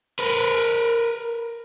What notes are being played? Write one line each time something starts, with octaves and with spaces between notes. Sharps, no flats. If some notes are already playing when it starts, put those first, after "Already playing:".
A#4 B4